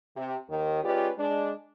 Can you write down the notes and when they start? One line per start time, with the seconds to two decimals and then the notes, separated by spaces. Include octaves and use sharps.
0.16 C3
0.49 D#2 D#3
0.84 G#3 C#4 F4 G4 B4 D5
1.18 G#3 D4